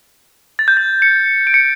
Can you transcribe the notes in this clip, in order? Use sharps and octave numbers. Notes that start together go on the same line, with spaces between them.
A6
G6
A6
C#7
D7
C#7